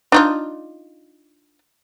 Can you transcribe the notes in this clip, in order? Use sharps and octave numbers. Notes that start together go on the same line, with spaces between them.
D4 D#4 F4